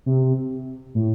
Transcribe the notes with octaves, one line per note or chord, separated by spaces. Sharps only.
C3
A2